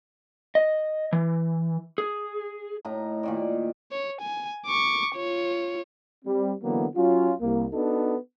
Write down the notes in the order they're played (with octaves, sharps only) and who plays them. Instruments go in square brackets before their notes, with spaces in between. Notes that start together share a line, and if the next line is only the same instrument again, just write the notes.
[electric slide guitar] D#5
E3
G#4
[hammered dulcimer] A2 D#4 A#5
A#2 D#3 D5
[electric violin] C#5
G#5
C#6 D6
F4 C#5
[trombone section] G3 C4
D3 E3 F#3 A#3 B3
F#3 C#4 F4
C2 A#3
B3 D4 D#4 F#4 A4